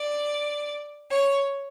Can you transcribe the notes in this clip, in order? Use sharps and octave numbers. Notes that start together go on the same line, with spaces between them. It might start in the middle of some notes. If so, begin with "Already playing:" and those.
Already playing: D5
C#5